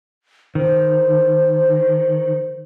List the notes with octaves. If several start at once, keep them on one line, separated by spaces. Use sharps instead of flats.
D#3 C5